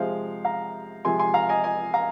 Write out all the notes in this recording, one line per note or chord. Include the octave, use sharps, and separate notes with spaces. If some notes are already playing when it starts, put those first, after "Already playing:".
Already playing: C3 F3 G#3 C5 F5
F5 A#5
C3 F3 G#3 G#5 C6
G#5 C6
F5 A#5
D#5 G#5
D#5 G#5
F5 A#5